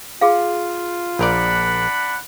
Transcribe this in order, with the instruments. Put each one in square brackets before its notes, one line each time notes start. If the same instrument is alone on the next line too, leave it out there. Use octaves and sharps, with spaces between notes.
[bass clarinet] F4 [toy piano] G#4 F5
[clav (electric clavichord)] A#1 A#4 D5 [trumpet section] D4 F#5 B5